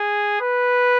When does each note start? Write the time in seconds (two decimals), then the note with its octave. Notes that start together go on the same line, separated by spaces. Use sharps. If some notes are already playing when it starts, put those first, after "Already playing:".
Already playing: G#4
0.41 B4